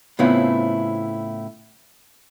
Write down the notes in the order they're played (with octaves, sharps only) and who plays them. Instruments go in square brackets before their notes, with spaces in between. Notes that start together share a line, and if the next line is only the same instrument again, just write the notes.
[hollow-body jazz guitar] A2 C#3 B3 C4 E4 F4